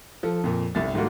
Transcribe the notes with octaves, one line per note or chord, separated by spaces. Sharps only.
F3 A4
F2 A#2
G1 C2 A6
G#2 D#3 G3 A3 A#3 F#4